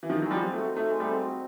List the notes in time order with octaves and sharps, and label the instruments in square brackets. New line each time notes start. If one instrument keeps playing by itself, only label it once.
[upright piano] E3
[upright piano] D#3 F3 [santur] D#4
[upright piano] F#3
[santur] G#3
[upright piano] F3 G3
[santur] C4
[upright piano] A3
[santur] F#4
[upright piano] A3 [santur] D#4
[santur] G#3
[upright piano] G3 A3
[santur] C4
F#4